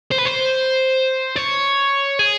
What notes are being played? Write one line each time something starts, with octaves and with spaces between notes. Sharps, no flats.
C5
B4
C5
C#5
G#4